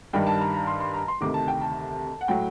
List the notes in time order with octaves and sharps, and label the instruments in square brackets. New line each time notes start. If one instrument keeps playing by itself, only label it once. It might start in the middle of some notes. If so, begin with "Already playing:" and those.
[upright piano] G2 D#3 G3 G5
A5
A#5
A#5
C6
C6
A#5
C6
D2 C3 D#3 D6
A5
G5
A5
F#5
A2 F#3 G5